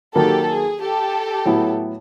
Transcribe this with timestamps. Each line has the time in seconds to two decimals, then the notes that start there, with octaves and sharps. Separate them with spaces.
0.15 D#3 F#3 A#3 G4 A4
0.48 G#4
0.80 G4 A4
1.46 A2 F#3 B3 E4